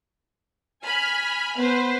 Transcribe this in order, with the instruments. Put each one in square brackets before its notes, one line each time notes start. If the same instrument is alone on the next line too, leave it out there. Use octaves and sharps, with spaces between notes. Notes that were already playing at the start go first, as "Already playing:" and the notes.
[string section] G#5 B5 F6
[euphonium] B3 [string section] B4 C5